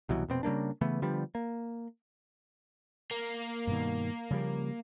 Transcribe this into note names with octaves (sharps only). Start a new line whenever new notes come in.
C2 B2 E3 F#3
F1 B2 C4
C#3 G3 A#3 D4
C#3 E3 A3 B3
D3 F3 G3 B3
A#3
A#3
G2 B2 D#3
C#3 F3 G3